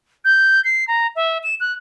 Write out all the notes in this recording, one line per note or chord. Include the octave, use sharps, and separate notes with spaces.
G6
C7
A#5
E5
E7
F#6